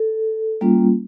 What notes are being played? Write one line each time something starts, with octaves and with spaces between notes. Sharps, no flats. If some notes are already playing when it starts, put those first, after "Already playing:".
Already playing: A4
G3 A#3 C#4 F4